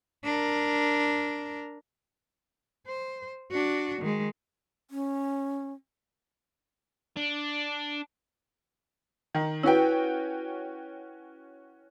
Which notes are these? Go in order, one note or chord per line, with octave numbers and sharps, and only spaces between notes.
D4 A#4
C5
D4 F#4
D#3 G#3
C#4
D4
D#3
C#4 E4 F#4 B4 G5